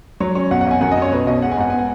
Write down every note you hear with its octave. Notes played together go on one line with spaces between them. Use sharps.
F#3 C#5
C#4 C#5
B1 F#5
F#5
B1 G#5
F#2 F#5
D#5
C#4 C#5
B2 B4
B1 D#5
G#3 F#5
G#5
G#2 F#5
B3 G#5
F#5